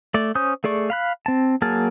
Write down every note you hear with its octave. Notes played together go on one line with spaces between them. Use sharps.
A3 D5
C#4 C5 D#6 G6
A3 G#4 D5 C#6
F5 B5 F#6
C4 A5
F#3 A#3 G#4 A5 F6